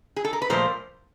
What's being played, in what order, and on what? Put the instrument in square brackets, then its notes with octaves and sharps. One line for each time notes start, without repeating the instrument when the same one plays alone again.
[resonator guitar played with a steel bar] G#4
A4
A#4
B4
A#2 F3 A3 A#4 C5